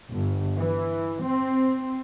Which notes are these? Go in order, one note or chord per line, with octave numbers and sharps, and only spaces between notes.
G1
E3
C4